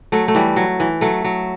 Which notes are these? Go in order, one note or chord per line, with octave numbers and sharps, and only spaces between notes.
F#3 A3
A3
E3 G3
F#3
E3
F#3 A3
F#3